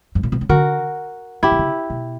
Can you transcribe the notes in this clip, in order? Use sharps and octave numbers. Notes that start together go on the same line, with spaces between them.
G2
A#2
B2
C#3
D3 F#4 A#4
C#3 E4 G4
B2
C#3
B2